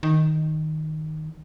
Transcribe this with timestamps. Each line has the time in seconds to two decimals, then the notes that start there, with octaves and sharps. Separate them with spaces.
0.03 D#3